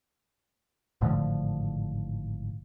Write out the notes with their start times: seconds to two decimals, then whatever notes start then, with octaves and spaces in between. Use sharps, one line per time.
1.01 G#1 A2 D3 F3